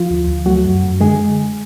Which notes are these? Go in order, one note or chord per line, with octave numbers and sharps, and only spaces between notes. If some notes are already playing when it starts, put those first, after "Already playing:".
Already playing: F3 F4
D2
D2
F#3 A3 F#4
F#2
F#2
D3 G#3 G#4